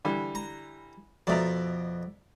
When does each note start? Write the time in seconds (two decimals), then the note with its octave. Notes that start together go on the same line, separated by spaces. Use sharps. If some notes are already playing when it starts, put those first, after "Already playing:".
0.05 D3 E3 G3
0.35 A#5
1.27 F2 B2 D5 E5 A#5